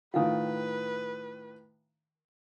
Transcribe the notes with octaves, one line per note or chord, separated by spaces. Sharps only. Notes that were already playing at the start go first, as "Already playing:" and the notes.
A2 D#3 F3 B4 F5 F#5